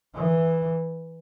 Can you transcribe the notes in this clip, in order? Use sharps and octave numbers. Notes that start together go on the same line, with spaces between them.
E3